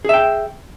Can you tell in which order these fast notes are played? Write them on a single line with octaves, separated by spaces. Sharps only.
G#4 E5 G5